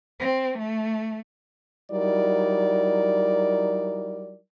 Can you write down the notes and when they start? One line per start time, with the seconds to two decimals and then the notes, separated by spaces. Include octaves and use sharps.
0.20 C4
0.58 A3
1.91 F#3 G3 D#4 E4 A#4 D5